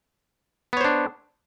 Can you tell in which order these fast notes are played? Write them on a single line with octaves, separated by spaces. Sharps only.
B3 C#5 C5 D4